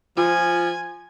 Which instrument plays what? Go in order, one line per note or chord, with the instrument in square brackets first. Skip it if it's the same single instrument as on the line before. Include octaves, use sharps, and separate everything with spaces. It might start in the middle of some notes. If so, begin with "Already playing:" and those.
[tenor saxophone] F3 [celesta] F4 [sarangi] G#5